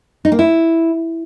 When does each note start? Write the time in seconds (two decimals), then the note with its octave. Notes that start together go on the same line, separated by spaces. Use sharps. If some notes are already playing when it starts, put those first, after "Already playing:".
0.25 D#4
0.32 A#3
0.39 E4